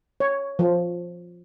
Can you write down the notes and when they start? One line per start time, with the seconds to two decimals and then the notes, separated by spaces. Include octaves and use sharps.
0.20 C#5
0.59 F3